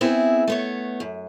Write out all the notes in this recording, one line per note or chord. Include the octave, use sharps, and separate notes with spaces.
B3 C4 E4 G#4
A3 B3 C#5
F#2